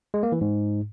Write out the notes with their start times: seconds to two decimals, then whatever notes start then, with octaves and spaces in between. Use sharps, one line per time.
0.14 G#3
0.23 A#3
0.32 E3
0.41 G#2